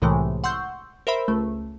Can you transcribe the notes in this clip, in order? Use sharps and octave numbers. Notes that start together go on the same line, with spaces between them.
C2 A2 C3 E3 G#3 A3
F#5 C6 C#6 E6 G6
A#4 C5 E5 B5
C#2 A3